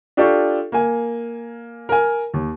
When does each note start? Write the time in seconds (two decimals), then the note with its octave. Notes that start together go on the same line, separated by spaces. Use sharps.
0.17 D4 F4 G4 A4 D5 C#6
0.72 A#3 G#5
1.89 A#4 G#5
2.34 D#2